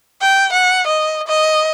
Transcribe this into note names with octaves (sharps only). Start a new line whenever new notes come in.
G5
F#5
D#5
D#5